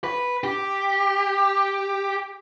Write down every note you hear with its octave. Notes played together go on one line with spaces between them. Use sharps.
B4
G4